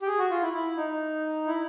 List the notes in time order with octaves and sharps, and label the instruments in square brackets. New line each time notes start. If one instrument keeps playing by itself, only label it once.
[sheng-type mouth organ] G4
G#4
F#4
F4
E4
E4
D#4
E4